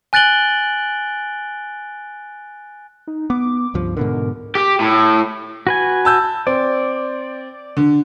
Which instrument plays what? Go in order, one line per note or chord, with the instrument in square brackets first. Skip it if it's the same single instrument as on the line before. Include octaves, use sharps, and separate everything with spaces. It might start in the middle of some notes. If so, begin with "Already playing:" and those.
[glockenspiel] G#5 F#6 A6 D7 F#7 G7
[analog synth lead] D#4
[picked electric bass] B3 [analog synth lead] D6
[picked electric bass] C#2 G2 F3
[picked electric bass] G#2 B2 D3 [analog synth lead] A#4
[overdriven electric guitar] G4
A2
[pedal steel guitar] F#4 B4 G#5
[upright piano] A5 E6 G6
[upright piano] C4 [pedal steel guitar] D5
[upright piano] D3